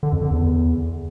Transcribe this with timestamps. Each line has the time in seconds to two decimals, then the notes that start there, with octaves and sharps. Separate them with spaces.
0.03 D3
0.12 F2
0.22 D3
0.31 E2